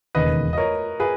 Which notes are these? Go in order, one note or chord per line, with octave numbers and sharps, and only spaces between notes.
E1 D#2 C#3 B4 D#5
D#5
A#4 C#5
G#4 B4